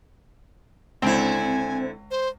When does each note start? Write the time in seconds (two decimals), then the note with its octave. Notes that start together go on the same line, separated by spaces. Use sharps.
1.02 C#2 D3 C4 E4 G#5
2.11 C5